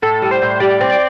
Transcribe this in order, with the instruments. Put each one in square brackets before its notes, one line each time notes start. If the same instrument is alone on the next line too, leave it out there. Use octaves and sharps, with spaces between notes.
[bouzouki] A2 [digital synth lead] A4
[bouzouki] G3
[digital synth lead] C5
[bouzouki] A2
[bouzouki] G3 [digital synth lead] D5
[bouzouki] C4
[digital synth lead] D5